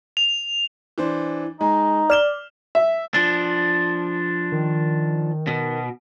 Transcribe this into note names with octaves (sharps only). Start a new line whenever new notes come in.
F7
E3 D4 C5
G#3 D#4
D5 F6 E7 G7
E5
F3 D4
D#3
B2